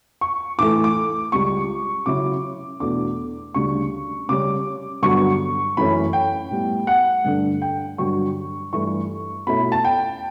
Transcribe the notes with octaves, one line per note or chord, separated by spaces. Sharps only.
C#6
A2 E3 A3 D6
D6
C#2 C#3 G3 C#6
C#3 F#3 C#4 E4 D6
E2 B2 A3 D4 D6
D2 C#3 G3 D4 C#6
C#3 G3 C#4 D6
G2 D3 F#3 B3 C#6
F#2 E3 A3 C#4 B5
G5
A2 G3 B3
F#5
G2 D3 A3 D4
G5
G2 D3 F#3 C#6
G2 E3 A3 E4 C#6
B2 A3 C#4 E4 B5
A5
G5